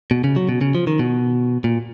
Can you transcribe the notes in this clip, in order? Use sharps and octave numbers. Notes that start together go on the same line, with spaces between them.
B2
C#3
F#3
B2
C#3
F3
D#3
B2
A#2